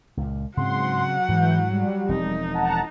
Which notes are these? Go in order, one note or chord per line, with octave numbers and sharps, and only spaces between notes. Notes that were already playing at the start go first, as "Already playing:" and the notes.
C#2 A#2
G#2 C#3 F#3 C4 F#5 C6
G#2 E3 G6
G3
E1 F3 C4 D#4
F#5 A5 A#5